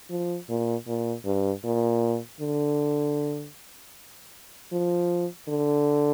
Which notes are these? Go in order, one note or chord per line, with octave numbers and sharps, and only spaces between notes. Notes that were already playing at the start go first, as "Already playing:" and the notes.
F3
A#2
A#2
G2
A#2
D3
F3
D3